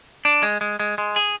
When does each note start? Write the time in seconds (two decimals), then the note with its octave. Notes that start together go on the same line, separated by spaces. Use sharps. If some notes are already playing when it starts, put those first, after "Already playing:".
0.25 D4
0.43 G#3
0.61 G#3
0.80 G#3
0.98 G#3
1.16 G#4